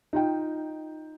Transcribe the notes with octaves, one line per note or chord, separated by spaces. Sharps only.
D#4 F4 G5